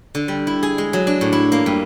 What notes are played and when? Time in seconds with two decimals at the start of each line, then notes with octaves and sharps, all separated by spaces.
0.15 D3
0.28 G3
0.47 E4
0.63 G#4
0.78 G#3
0.93 F#3
1.07 D4
1.21 A2
1.33 E4
1.52 A#3
1.66 G2